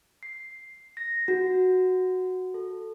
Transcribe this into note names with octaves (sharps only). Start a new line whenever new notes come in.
C7
A#6
F#4
A4